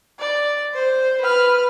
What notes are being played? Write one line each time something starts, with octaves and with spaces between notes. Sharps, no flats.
D5
C5
B4 F6